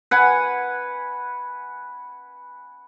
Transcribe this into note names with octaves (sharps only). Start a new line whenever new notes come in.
B4 F#5 G#5